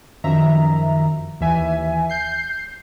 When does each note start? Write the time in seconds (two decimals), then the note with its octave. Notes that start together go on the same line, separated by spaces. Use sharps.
0.24 F#2 D#3 F3 E5 A#5
1.40 D#2 E3 E5 G#5
2.10 G6 C7